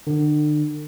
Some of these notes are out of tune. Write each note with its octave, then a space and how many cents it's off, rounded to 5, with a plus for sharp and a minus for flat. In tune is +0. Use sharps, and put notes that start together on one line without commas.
D3 +40